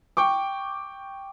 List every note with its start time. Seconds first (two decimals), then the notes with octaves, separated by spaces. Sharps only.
0.17 G5 C#6 D6